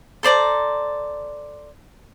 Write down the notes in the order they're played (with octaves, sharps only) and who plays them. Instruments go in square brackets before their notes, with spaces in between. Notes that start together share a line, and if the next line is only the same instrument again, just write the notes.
[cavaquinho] A4 C5 D5 A#5